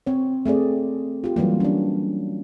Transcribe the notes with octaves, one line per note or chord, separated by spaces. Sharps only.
C4 C#5
A3 C4 G#4 D5
F4 G4
E3 F#3 G3 A#3
C#4 D4